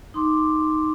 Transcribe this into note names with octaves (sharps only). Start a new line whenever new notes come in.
D#4 C6 D6